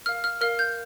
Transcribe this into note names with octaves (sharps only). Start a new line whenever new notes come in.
A#4 F5 F6
F6
A#4 F5 F6
G6